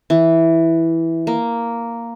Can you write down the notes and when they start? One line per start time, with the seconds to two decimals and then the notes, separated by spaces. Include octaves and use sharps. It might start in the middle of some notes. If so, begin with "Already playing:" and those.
0.10 E3
1.27 A#3